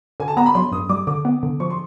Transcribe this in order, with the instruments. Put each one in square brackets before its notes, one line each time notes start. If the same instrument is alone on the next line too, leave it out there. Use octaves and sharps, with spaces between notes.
[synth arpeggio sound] D3 [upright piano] G#5
[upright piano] A5
[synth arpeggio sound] B3 [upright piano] A#5
[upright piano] B5
[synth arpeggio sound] F#3 [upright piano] C6
[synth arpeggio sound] G2 [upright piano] D#6
[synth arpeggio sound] G3 [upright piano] D6
[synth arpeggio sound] D3 [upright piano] D6
[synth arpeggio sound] B3
D3
[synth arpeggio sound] F3 [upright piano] C#6
[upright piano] C6